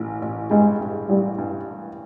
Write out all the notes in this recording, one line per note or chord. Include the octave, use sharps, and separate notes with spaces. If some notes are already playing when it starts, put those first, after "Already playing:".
Already playing: A1
A1
G2 G#3
G2
A1 G3
G2